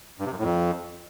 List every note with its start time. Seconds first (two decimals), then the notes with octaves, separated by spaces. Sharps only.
0.19 G2
0.25 C3
0.32 F#2
0.38 A2
0.44 F2